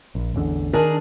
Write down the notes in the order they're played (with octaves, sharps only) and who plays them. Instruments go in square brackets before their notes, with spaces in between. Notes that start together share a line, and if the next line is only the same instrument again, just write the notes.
[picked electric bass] A#1
A1 E2 D3
[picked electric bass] D#3 [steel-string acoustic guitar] D4 G#4 A#4